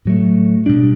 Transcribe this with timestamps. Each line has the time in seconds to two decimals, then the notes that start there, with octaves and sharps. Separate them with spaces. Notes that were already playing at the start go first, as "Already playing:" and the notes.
0.05 A2 F#3 A3
0.66 B2 G3 D4